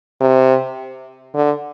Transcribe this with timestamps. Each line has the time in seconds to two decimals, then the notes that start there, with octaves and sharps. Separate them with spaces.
0.21 C3
1.35 D3